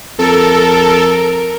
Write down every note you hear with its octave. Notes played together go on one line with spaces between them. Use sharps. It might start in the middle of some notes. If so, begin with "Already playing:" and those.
F2 A4 A#4